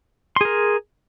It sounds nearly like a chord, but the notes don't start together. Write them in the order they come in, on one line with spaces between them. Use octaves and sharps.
C6 G#4 A#4